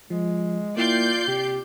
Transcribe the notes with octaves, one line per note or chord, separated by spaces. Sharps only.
F3 G#3
A#3 E4 F4 D5 G5 G6 C7
C3 G4